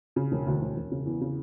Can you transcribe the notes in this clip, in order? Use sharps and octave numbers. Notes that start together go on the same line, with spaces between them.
C#3
E1
D2
E1
E1
C#3
E2
C#3